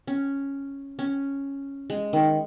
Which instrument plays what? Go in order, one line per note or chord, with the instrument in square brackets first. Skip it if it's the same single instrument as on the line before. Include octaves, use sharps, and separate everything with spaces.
[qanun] C#4
C#4
G#3
D#3